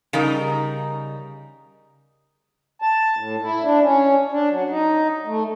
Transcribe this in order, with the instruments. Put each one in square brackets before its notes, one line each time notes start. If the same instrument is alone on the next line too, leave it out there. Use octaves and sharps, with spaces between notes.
[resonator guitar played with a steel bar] C#3 G3 D#4 A#4
[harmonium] A5
A2
E4
D4
C#4
D4
F#3
D#4
A3